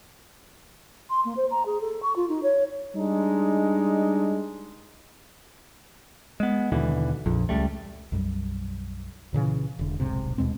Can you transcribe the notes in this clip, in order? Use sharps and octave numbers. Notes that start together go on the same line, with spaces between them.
C6
A#3
C5
A#5
G#4
A4
C#6
F4
D#4
C#5
G3 G#3 D4 D#4
G#3 B3
D#2 B2 D3 E3
A#1 F2
C#2 G3 A3
B1 F#2 G3
C2 A#2 C#3 E3
E1 D3
D#1 B1 G#2 C3
D#2 B2 G#3 C4